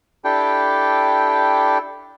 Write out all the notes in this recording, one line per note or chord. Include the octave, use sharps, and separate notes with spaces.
D4 E4 G4 A4 G5